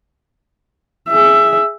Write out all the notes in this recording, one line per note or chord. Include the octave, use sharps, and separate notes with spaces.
G#4 E5